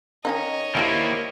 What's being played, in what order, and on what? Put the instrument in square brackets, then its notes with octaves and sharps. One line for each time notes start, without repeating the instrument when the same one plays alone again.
[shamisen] D#3 C#4 D#4 [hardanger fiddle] C#5 D#5
[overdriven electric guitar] D#3 A#3 [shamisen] F3 G3 G#3 [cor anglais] E4